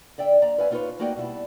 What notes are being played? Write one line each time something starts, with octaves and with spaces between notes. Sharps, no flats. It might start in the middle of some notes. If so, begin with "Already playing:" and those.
D3 D5 E5 G5
D#2 D5 A#5
B4 C#5 E5 F5 G#5
C#4 D#4 F4 A4 B4 C#5
A3 A#3 D#4 F#4 D5 G5
B2 G3 E4